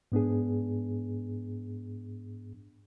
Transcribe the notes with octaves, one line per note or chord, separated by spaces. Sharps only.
G#2 B3 D4 G#4